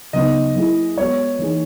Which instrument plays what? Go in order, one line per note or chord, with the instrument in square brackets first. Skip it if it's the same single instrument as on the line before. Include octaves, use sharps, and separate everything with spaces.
[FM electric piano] C#3 F#3 B3 D#4 [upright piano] D#5
[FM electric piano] F#3 A#3 E4 G#4
[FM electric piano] G#3 B3 F#4 [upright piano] C#5
[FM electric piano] E3 A#3 D#4 G#4